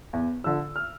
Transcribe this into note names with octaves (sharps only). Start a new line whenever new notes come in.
E2
D3 F3 E6
F6